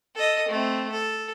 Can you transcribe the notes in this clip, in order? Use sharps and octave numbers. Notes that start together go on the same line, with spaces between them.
A4 D#5
A3 C4
A4